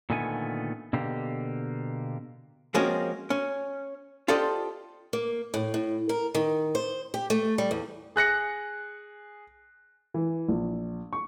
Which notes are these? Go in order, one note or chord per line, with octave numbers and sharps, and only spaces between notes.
A#2 D3 D#3 A3 B3 G#5
B2 D3 A#3 G4
F3 G#3 A#3 C4 C#4 F#4
C#4
F4 G4 A4 C5 D5 D#5
A#3
A2
A2
A#4
D#3
C5
G4
A3
G3
E2
G#4 F#6 A#6 C#7
E3
A#1
C#6